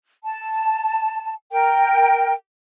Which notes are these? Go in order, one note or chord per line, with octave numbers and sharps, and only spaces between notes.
A5
A#4 G5